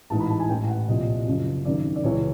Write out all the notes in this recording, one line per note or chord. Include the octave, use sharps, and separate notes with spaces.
A1 G#2 E3 A5
B5
A5
G#5
A1 A2 E3 G5
F#5
C2 A#2 F3 D#5
F#1 F#2 C#3 F3
G#1 F#2 D#3 D5
D5
C#2 C#3 E3 C#5